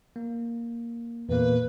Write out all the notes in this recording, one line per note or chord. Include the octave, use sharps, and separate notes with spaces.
A#3
E2 A#2 A#3 B4